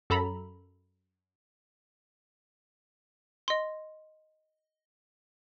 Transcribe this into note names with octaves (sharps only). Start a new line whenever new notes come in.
F#2 A4 A#5 B5
D#5 C6